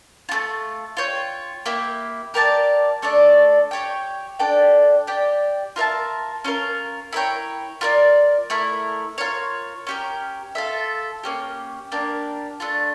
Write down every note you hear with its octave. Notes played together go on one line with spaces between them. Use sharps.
A3 D4 F4
F4 C#5 G5
A#3 E4 G4
G4 A#4 D5 A5
A3 D4 A4 D5
G4 C#5 G5
D4 A4 D5 G5
G4 D5 G5
F4 A#4 E5 A5
C#4 F4 A#4
E4 A#4 C#5 G5
F4 A#4 D5
A3 E4 A#4
F4 A#4 C#5
C#4 G4 A#4
F4 A4 E5
A#3 C#4 G4
A#3 D4 G4 A#4
A3 D4 F4